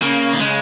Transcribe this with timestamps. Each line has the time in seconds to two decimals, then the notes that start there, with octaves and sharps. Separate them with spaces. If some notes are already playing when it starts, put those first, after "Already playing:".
0.02 C#3 A#3
0.34 D#3
0.40 C#3 G#3